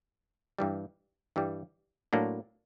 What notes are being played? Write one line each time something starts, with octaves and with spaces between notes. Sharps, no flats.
G2 E3 G3
G2 E3 G3
A2 F#3 A#3 D4